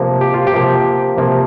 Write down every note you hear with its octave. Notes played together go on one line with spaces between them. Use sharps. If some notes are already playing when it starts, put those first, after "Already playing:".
Already playing: C3 F3 A#3
G4
F4
G4
C3 F3 A#3
C3 F3 A#3